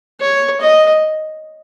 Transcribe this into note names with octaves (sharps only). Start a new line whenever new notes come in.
C#5
D#5